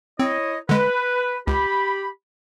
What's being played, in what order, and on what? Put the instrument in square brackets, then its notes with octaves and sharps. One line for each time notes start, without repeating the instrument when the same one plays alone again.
[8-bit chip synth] C4 [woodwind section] E4 C#5 D#5
[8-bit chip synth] D3 G#3 [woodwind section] B4
[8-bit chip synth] C#2 [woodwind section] G4 B5